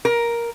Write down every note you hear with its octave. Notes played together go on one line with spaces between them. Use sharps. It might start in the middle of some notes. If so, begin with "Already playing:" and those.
A#4